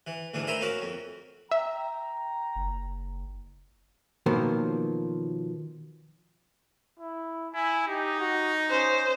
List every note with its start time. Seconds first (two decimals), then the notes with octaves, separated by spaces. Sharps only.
0.07 E3
0.34 D2 G#2 E3 D4
0.47 A#4 C5 E5 G#5 A#5 B5
0.60 A#3 C#4 F#4 A#4
0.82 F2
1.51 E5 G5 A#5
2.56 F#1
4.26 B2 D#3 F3 F#3 A#3
6.99 E4
7.55 E4 G#5
7.87 D#4 G4
8.20 F#4
8.70 C#4 C5